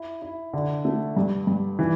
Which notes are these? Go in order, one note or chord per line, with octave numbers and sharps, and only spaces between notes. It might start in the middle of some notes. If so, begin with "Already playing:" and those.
Already playing: E4
E4
D3
A3
G2
G2
E3